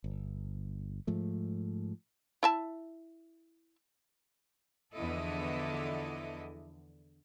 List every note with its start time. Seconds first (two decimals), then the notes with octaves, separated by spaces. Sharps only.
0.04 G1
1.07 G#2 F3 A3
2.43 E4 E5 A5
4.94 E2 D3 F3 E4 A4 D#5